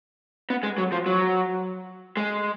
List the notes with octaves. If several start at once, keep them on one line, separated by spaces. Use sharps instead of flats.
B3
G#3
F#3
F3
F#3
G#3